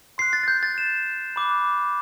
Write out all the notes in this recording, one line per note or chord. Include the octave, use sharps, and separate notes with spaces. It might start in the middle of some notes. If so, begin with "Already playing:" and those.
C6 F#6 C7
A6
A6
G6
A6
E7
B5 D6 F#6